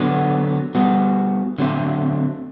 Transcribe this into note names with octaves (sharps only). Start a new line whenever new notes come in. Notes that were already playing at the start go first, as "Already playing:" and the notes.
Already playing: D3 F#3 B3
G3 B3 F#4
D3 F#3 A3 C4